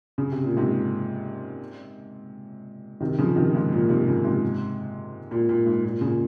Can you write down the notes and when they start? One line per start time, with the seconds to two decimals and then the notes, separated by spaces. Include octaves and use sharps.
0.18 C#3
0.32 C3
0.44 A#2
0.57 G#2 C3
3.00 C3 D#3
3.18 C#3 F3
3.36 C3 D#3
3.55 G#2
3.72 A#2
3.89 G#2 C3
4.06 A#2 C#3
4.24 G#2 C3
5.31 A#2
5.49 A#2
5.66 G#2
5.85 A#2
6.01 A#2 C#3